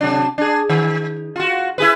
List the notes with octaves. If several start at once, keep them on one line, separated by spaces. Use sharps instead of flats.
C3 F#3 D4
D4 G#4
D#3
F4 F#4
E4 G#4 B4